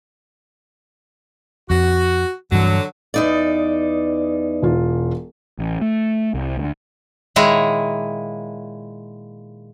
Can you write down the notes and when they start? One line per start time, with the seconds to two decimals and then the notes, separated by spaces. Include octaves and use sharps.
1.70 F2 F#4
2.52 G2 D3 E3 F#3
3.14 E2 D#4 D5
4.62 E1 F4
5.59 A1
5.82 A3
6.34 C2
6.57 D2
7.36 A#2 D#3 G#3 E4 C#5 A#5